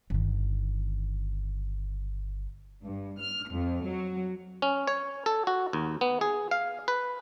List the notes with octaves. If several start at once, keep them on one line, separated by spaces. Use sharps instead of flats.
G1 D#3
G2
F6
F2
F#3
C#4
C#5
A4
F#4
D#2
B3
G#4
F5
B4